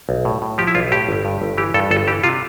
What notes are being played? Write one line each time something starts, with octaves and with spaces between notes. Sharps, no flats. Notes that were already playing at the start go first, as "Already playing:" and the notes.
B1
A2
A2
F3 G4
E4
B1 F4
A2 G4
G1
G2
G1
E3 G4
G2 A4
G1 A4
E3 G4
C3 F4